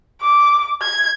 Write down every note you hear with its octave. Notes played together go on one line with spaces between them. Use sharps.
D6
G#6